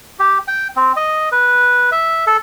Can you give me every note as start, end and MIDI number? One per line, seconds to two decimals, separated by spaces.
0.19 0.38 67
0.48 0.68 79
0.76 0.92 60
0.96 1.29 75
1.32 1.90 71
1.92 2.25 76
2.27 2.37 69